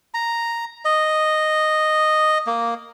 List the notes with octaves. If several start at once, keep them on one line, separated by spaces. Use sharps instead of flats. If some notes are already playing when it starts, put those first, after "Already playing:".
A#5
D#5
A#3